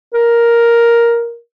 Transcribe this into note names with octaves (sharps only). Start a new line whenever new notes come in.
A#4